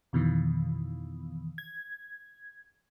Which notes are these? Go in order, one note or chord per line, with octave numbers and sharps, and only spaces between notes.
F2 B2 D#3 E3
G#6